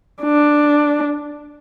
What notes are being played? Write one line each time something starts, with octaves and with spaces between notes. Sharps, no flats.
D4